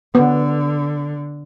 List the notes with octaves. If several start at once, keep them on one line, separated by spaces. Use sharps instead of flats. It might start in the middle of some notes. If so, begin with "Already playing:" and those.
D3 B3